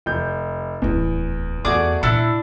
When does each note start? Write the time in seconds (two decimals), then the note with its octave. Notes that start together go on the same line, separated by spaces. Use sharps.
0.06 F1 G6
0.82 D1 E2 E4
1.65 E2 A3 F#4 G#4 D5 D6
2.03 A#2 D4 E4 C#7